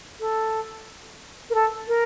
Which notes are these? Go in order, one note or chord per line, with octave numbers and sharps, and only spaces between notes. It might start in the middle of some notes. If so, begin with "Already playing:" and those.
A4
A#4
A4
A#4